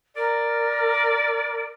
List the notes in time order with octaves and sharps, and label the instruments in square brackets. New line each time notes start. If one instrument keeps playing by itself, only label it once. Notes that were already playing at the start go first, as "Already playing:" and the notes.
[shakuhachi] A#4 [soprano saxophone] D5